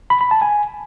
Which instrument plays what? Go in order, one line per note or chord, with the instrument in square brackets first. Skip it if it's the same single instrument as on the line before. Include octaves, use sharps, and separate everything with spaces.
[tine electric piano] B5
B5
A5
G#5